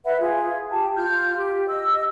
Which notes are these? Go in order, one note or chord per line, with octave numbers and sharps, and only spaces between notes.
B4 E5 F#5 B5
F4 G#4
G4 G5 A5
F4 F6 G6
G4
D#5 E6